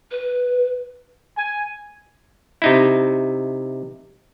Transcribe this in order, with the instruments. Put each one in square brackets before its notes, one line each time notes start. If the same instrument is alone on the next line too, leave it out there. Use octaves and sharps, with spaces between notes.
[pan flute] B4
[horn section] G#5
[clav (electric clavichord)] C3 D#4 E4